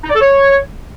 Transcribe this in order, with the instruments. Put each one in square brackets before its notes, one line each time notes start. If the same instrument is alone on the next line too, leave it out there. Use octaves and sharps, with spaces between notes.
[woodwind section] D#4
D5
A4
C#5